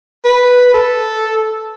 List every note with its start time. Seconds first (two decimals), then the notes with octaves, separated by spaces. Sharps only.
0.25 B4
0.74 A4